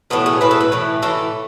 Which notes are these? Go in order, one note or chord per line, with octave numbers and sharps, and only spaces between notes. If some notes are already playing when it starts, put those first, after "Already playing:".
A2 E3 A3 B3
G#4
A2 E3 A3 B4
A4
B4
A2 E3 A3
A2 E3 A3 A4